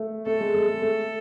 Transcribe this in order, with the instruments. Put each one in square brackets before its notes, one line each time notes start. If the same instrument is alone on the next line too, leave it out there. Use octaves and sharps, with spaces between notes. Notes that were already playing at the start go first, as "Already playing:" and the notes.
Already playing: [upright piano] A3
[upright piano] A3 [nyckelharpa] A4
[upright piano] G#3
G#3
G#3
A3